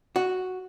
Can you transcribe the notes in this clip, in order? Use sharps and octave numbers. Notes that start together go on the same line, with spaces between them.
F#4